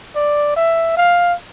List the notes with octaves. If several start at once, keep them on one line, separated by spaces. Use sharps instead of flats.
D5
E5
F5